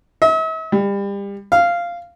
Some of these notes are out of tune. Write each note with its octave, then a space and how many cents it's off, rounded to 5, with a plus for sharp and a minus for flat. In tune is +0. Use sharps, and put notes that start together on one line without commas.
E5 -45
G3 +30
F5 -10